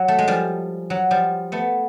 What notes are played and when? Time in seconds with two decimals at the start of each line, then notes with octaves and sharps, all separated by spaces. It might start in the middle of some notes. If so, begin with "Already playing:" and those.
Already playing: F#3
0.08 A3
0.19 G#3
0.28 F3 G3
0.90 F#3
1.11 F3 G3
1.52 A3 B3